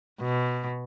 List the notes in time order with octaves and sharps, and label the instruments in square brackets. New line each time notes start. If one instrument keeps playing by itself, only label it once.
[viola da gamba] B2